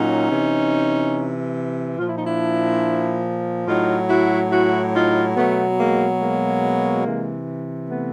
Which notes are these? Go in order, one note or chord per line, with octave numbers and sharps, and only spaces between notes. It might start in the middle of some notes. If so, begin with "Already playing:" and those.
Already playing: A#2 F#3 C#4 D#4
C3 E3
A#2 F3 F4
E4
D#4
D4 E4
A2 F#3 D#4 F4
E4 F#4
E4 F#4
D#4 F4
B2 F#3 A3 B3
G#3 A#3
G#3 A#3
C3 E3
A3 B3